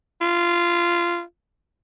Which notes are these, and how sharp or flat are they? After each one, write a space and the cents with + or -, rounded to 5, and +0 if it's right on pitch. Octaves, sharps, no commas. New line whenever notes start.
F4 -15